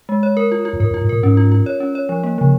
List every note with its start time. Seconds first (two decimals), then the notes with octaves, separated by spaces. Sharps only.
0.09 G#3
0.23 C#5
0.37 A#4
0.52 F4
0.65 F4
0.73 F2
0.80 G#2 A#4
0.91 F2
0.94 F4
1.01 G#2
1.09 A#2 A#4
1.22 G#2 C#4
1.37 F4
1.52 F4
1.66 C#5
1.80 C#4
1.95 C#5
2.09 F3
2.23 A#3
2.38 C#3 F3